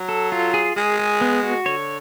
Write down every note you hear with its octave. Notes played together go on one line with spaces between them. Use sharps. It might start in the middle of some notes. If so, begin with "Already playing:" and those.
Already playing: F#3
A4
F4
G#4
G#3 G#4
G#4
B3
F#4
D3 C#5